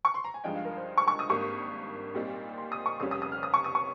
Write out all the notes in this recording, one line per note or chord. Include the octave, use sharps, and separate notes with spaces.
C#6
C6
A#5
G#5
G2 F3 G#3 D#4 G5
F5
A#4
C5
C#6
C#6
D#6
G#1 G2 G3 A#3 C#6
A#2 G3 C4 D#4
C6
D#6
C#6
F1 F2 C#3 G3 C#4 D#6
D#6
D#6
F6
D#6
C#6
D#6
C#6